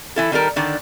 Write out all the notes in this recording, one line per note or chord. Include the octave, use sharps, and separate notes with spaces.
E3 E4 A4
D#3 G3 A4 A#4
D3 D#3 D4